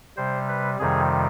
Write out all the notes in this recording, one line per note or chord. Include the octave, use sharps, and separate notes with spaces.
C3 G3 C5
B4
F2 C3 D#3 G3 G#4